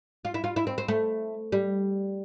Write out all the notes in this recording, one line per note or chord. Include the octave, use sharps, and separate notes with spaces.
F4
E4
F4
E4
C4
C4
A3
G3